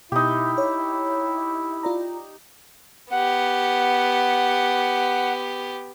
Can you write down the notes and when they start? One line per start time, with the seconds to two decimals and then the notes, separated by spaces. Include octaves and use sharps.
0.12 B2 D#4 E4 G4
0.58 C#5
1.83 F4 D5 A#5
3.11 B3 G4 F#5